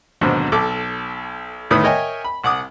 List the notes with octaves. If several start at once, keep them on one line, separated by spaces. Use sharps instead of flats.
D#2 G#2 B2 D3 F#3 C4
B1 A4 D6
D2 A2 D#3 B3 B5 D#6
A#4 C#5 D#5 E5 G5 G#5
B5
C2 F#5 D6 D#6